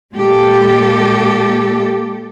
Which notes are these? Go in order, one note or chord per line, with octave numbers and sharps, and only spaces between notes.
A#2 G#3 A#3 G4 A4